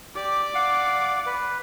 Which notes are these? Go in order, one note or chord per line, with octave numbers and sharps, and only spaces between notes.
G4 D5 D6
F5 F#5
B4